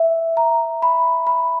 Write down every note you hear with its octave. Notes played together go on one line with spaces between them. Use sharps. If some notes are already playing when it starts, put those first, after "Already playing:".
Already playing: E5
A#5
B5
B5